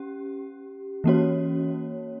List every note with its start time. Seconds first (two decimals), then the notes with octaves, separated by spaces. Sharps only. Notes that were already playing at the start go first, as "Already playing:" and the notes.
Already playing: C#4 G4
1.04 E3 A#3 C#4 F#4 C#5